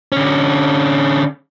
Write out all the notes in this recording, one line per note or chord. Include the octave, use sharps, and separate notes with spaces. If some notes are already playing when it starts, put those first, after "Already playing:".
D3 C#4